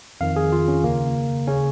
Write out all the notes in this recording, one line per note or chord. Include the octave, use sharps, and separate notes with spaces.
F2 D#3 F5
G#4
F4
C#4
D#2 C#3 A#3
C#3 C#4